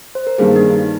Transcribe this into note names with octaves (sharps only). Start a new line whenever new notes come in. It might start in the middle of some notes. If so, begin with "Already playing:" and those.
C5
A#4
G2 D#3 G3 A#3 G#4
D#4
D4
D#4